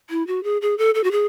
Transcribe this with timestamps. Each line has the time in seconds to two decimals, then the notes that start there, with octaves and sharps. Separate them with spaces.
0.10 E4
0.27 F#4
0.44 G#4
0.62 G#4
0.78 A4
0.95 A4
1.04 F#4
1.11 G#4